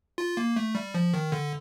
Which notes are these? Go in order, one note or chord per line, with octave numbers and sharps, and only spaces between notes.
F4
A#3
A3
G3
F3
D#3
D3